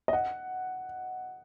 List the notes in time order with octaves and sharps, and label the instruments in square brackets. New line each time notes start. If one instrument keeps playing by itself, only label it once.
[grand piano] D#5
F#5